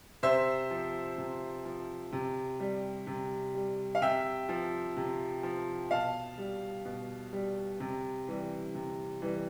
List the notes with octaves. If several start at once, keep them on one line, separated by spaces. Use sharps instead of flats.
C3 C5 E5
F3
C3
F3
C3
G3
C3
G3
F5
C3 E5 G5
F3
C3
F3
B2 F5 A5
G3
B2
G3
C3
E3 G3
C3
E3 G3